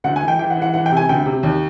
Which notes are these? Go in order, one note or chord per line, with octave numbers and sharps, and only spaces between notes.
D2 F#5
G#5
E3
G5
E3 G5
F#5
E3
F#5
E3 F#5
G5
C3
G#5
D2 G5
C3
D#2